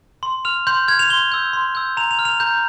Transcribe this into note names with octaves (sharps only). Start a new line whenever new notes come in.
C6
F6 F7
C6 G6
F6 G#6
F7
C6 G7
E6 G6
C6
E6 G6
A#5 F7
F7
F6
F7
A#5 G6